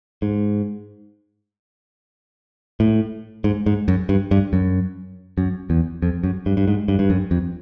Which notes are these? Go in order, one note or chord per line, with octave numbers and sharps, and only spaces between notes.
G#2
A2
G#2
G#2
F#2
G2
G2
F#2
F#2
E2
F2
F#2
G2
G2
G#2
G2
G2
F#2
F2